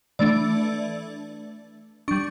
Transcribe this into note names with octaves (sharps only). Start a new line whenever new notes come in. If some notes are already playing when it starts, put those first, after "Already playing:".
E3 A3 D4 D5
G3 D4 C#6